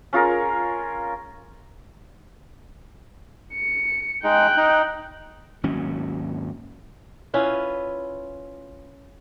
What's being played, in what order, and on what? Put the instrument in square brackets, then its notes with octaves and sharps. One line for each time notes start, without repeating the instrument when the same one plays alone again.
[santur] C#4 F4 G#4 A#4
[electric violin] C#7
[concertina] G#3 D#4 [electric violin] G5 F#6
[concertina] D#4
[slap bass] G#1 D#2 F#3 C#4
[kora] C#4 E4 F4 B4